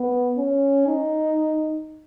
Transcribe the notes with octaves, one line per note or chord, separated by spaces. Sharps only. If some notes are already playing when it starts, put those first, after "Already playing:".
Already playing: B3
C#4
D#4